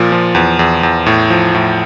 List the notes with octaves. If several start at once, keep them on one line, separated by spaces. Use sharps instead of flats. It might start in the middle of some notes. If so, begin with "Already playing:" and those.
Already playing: A#2 F3
F3
E2
E2
E2
A2
F3
A2